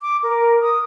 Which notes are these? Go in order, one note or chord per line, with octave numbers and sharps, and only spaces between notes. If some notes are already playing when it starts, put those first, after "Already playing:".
D6
A#4
D#6